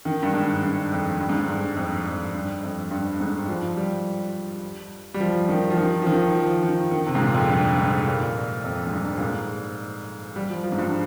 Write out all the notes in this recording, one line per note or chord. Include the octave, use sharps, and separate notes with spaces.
D#3
G2
G#2
G2
F2
G2
G#2
G2
G2
F2
F2
G2
F2
G2
G#2
F3
G3
G3
F3
D#3
F3
D#3
F3
D#3
F3
D#3
D#3
C3
G#2
A#2
F2
G2
G#2
A#2
F2
G#2
G2
A#2
G#2
G3
F3
F3
G#2
G2